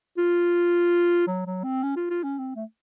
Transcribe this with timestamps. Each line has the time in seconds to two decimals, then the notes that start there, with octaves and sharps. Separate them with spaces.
0.18 F4
1.27 F#3
1.46 F#3
1.64 C4
1.83 C#4
1.96 F4
2.10 F4
2.23 C#4
2.38 C4
2.56 A3